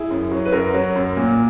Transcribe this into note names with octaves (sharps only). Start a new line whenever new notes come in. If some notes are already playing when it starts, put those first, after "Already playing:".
Already playing: E4 G#4
F#2
F#3
B4
F#2 F#4 A#4
F#3
F#2
A#2